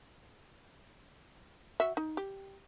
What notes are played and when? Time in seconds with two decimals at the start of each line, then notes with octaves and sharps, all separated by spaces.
1.80 F#4 E5
1.97 D#4
2.17 G4